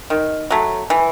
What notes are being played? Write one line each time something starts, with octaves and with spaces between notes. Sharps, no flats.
D#3
F#3 A3
E3